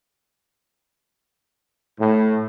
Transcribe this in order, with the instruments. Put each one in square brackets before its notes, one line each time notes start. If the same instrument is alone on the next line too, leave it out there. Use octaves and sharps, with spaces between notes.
[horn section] A2